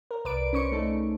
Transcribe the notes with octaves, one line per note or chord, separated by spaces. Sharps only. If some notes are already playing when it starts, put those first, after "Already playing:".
A#4
C2 B4 D5 D7
C#4 C5 C#6 C#7 D7
A3 D#4 A4
C#3